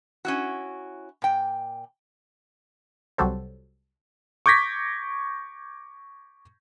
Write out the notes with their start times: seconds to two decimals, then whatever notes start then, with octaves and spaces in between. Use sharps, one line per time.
0.25 C#4 E4 F#4
1.22 A#2 G5
3.18 C2 F#3 G3 F#4 A4 C5
4.46 C#6 D6 G6 G#6 A#6 B6